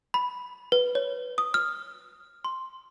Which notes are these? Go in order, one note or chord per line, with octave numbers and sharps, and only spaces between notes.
B5
B4
C#5
D#6
F6
C6